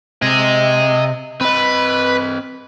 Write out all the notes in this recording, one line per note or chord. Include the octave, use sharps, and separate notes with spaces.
C3 D#5 G#5
C4 B4 D#5